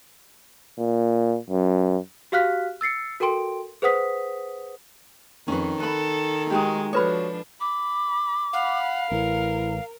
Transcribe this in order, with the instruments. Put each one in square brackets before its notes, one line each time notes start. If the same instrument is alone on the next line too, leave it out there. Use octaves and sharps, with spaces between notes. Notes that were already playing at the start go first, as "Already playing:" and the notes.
[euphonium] A#2
F#2
[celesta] F#4 G4 F5 F6 F#6 B6
E6 A6 C7 C#7
F#4 A4 A#4 G5 C6 D7
G#4 B4 C5 F#5 D#6 B6
[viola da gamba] F2 [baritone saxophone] D#3 [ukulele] C#4 B4
[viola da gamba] A4 [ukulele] B4 B5
[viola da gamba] G#3 [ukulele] D#4 F#4 G4
[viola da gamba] F3 D4 [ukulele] F#4 C#5 [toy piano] A4 B4 B5
[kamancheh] B5 [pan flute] D6
[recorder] F5 [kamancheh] F#5 B5
[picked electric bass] A1 [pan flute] E4 [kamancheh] A#4